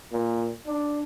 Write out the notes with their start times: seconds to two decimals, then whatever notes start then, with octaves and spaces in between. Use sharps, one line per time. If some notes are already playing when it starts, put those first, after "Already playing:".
0.12 A#2
0.67 D4